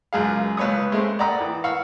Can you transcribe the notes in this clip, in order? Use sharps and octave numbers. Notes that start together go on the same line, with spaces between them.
C#2 F#2 G#4 F5
C#2 B4 C#5 C#6 D#6
G#3 A3 C4
D5 F#5 G5 A#5 B5 D#6
E3
F5 F#5 C#6 E6